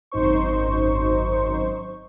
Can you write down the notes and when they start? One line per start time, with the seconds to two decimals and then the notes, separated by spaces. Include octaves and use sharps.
0.12 G#1 F#2 D#4 C5 C#6